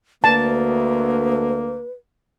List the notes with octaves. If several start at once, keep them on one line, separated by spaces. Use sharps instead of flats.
D2 A#3 B4 A5